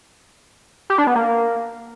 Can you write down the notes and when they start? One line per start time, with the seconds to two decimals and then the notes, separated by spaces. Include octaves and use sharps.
0.90 G4
0.98 D4
1.07 B3
1.15 A#3